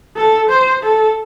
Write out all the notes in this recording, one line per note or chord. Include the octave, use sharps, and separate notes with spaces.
A4
C5
A4